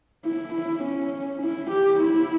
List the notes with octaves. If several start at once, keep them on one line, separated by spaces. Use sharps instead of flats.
E4
E4
C#4
E4
G4
E4